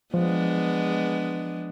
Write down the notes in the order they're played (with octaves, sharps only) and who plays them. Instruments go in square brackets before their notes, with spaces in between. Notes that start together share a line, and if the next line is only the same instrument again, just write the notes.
[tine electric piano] F3 [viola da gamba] G#3 B3 D4